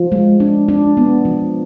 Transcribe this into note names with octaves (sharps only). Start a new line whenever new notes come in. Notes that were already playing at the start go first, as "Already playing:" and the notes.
Already playing: F3
G#3
D4
D4
B3
F3